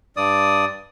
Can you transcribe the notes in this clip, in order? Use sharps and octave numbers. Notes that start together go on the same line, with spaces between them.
G2 D5 D#6